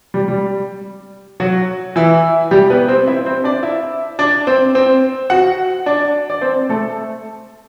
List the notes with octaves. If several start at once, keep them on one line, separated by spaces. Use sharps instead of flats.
G3
G3
F#3 F#4
E3 E4
G3 G4
B3 B4
C4 C5
E4 E5
C4 C5
D4 D5
E4 E5
D4 D5
C4 C5
C4 C5
F#4 F#5
D4 D5
D5
C4 C5
A3 A4